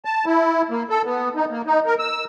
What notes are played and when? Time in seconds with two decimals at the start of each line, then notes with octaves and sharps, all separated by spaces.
0.05 A5
0.26 E4
0.70 A#3
0.90 A4
1.05 B3
1.36 D#4
1.51 A#3
1.67 D#4
1.86 A#4
1.99 E6